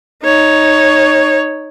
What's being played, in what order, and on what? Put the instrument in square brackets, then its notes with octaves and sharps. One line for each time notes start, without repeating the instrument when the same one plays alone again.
[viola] D#4 C#5